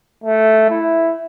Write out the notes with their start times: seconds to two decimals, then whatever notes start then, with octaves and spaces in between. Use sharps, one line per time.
0.24 A3
0.70 E4